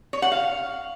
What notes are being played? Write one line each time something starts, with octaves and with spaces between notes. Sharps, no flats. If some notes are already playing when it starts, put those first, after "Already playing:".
C#5
F#5
F5